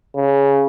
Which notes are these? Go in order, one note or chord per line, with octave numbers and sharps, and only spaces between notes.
C#3